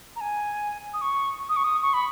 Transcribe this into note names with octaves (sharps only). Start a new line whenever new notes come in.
A#5
G#5
D#6
C#6
D#6
C#6
D#6
C#6
B5